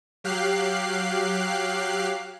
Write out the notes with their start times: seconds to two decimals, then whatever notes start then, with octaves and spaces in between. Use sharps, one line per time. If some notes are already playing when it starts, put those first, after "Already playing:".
0.24 F#3 G4 F5 F#6 C7